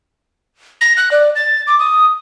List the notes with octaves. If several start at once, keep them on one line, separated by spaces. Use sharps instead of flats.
A#6
F#6
D5
A6
D6
D#6